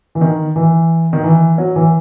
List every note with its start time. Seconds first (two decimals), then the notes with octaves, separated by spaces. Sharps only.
0.15 E3
0.21 D#3
0.56 E3
1.13 D#3
1.24 E3
1.58 F#3
1.76 E3